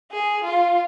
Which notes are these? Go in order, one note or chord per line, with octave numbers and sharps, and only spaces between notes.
G#4
F4